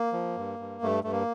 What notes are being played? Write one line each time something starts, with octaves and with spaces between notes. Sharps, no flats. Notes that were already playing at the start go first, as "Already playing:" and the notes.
Already playing: A#3
F3
G2
G2
G2 A3
G2 A3
A#3